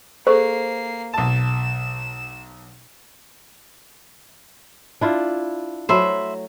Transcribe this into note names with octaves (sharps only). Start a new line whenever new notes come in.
A#3 G#4 A4 C5 C#6 C7
B1 A5 E7
D4 E4 F4
F#3 A3 C5 E5 B5